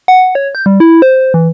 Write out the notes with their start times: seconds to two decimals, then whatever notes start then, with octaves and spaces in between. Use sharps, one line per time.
0.08 F#5
0.35 C#5
0.55 G6
0.66 G3
0.80 E4
1.02 C5
1.34 E3